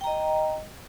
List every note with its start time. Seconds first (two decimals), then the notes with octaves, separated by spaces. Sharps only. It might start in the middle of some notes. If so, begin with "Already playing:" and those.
0.01 G5
0.04 A#5
0.07 D#5